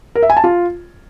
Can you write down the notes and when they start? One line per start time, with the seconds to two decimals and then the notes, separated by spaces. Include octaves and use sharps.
0.15 A#4
0.23 E5
0.30 G#5
0.37 A5
0.44 F4